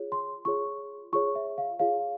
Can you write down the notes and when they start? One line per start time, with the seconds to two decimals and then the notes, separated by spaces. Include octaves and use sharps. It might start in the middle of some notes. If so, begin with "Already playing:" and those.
Already playing: F4 G#4 C#5
0.12 C6
0.45 F4 G#4 C#5 C#6
1.13 F4 G#4 C#5 C#6
1.35 E5
1.58 F5
1.79 F4 G#4 C#5 F5